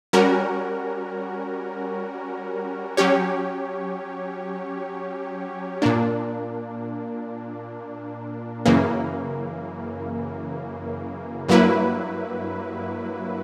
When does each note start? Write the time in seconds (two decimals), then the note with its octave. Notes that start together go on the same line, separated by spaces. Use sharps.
0.13 G3 C#4 F#4 A#4
2.97 F#3 C#4 G4 C#5
5.82 A#2 A#3 D4
8.65 F#2 C#3 E3 A#3
11.49 G2 F#3 A#3 E4 B4